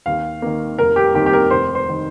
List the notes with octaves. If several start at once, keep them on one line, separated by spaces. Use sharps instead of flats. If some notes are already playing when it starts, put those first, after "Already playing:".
D#2 F5
D#3 A#3
F1 A#4
G4
D#2 D#3 C4 G4
G4
A#4
F1 C5
C5
D#3